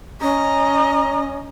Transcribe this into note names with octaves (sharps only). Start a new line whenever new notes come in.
C#4 D#5 A#5